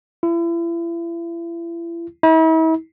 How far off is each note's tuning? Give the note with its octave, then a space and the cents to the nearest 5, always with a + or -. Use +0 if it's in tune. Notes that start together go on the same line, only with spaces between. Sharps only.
E4 +40
E4 -40